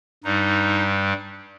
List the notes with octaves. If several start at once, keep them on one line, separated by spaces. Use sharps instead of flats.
G2 G3 D#4